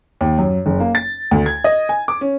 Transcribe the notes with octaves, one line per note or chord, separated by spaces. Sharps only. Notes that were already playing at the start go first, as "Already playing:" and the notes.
D#2
F#2
F#1
A#3
A6
D2
G#6
D#5
G#5
D6
C#4